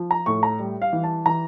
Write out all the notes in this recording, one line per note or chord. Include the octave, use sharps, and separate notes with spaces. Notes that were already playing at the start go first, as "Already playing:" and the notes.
Already playing: F3
A#5
A2 C#6
A#5
G3
F5
E3
A5
E3 A#5